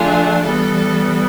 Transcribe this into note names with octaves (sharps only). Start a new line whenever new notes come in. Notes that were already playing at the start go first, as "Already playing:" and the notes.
Already playing: D3 F3 A3 D4 F4 G#4
E3 G3 B3 A4